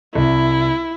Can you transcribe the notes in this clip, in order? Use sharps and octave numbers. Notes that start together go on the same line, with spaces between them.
C2 E4